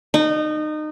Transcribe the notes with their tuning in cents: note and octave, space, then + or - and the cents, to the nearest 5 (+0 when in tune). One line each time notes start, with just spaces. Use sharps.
D#4 -25